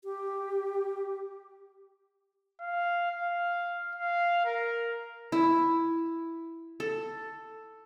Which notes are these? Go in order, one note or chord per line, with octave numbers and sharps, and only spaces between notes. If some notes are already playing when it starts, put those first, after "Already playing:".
G4
F5
F5
F5
A#4
E4
A4